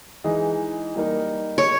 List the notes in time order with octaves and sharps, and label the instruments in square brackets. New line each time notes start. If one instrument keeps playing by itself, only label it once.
[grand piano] E3 G#3 D#4 G#4 D#5
G3 A#3 D#4 A#4
[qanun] C#5